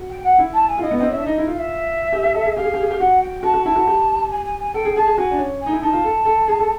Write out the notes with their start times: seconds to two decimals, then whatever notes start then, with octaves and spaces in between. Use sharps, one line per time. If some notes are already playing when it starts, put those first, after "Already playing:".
Already playing: F#4
0.10 G5
0.24 F#5
0.39 E4
0.53 A5
0.68 G#5
0.78 F4
0.82 E4 D#5
0.91 B3
0.97 C4 D#5
1.09 C#4 E5
1.17 D4
1.25 D#4 D#5
1.38 E4
1.47 F4
1.55 F5
1.59 E5
2.12 G4
2.23 G4
2.34 A4
2.46 G#4
2.57 G4 F5
2.64 G#4
2.74 G4
2.82 G#4
2.91 G4
2.99 F#4 F#5
3.22 G5
3.43 F#4 A5
3.54 F#4
3.65 E4 A5
3.76 F#4
3.87 G4
4.31 G#5
4.45 G#5
4.59 G#5
4.74 A4 G5
4.85 G#4
4.96 G#4 A5
5.07 G#4
5.18 F#4 G#5
5.31 D4
5.39 C#4
5.61 G#5
5.66 D#4
5.72 E4
5.82 D#4 A5
5.93 F4
6.04 A4
6.25 A4
6.48 G#4
6.59 A4